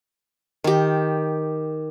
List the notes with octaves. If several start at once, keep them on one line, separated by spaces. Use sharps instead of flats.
D#3 G4